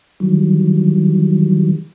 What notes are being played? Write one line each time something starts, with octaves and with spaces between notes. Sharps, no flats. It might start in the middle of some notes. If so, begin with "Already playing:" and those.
D#3 E3 F#3 G3